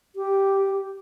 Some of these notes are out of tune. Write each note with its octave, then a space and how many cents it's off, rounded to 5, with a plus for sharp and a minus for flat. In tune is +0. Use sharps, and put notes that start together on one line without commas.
G4 -5